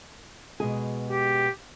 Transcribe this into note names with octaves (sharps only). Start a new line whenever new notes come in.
B2 G#3 G#4
G4